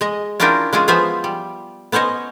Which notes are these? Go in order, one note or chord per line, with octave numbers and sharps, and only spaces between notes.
G#3 D#5
C#4 D4 E4 F4 A#4 G5
G#3 C#4 F4 G#4
F3 B3 F4 C5 E5 G#5
G3
B3 C#4 C5 C#5 D#5